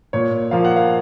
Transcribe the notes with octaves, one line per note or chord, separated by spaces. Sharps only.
A#2 C#5
F3 A#3 F4 F5
F#5
F5